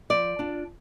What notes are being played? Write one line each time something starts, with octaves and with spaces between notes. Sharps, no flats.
F3 D5
D4 F4